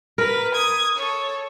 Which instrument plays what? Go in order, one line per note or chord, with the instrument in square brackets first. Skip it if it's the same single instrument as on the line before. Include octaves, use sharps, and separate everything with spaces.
[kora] A#4 [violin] B4
[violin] D#6 G#6
A4 C#5